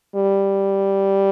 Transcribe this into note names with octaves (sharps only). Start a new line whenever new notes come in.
G3